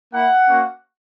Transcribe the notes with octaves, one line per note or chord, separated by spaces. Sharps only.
A#3 E4 F#5
A#3 C#4 F#4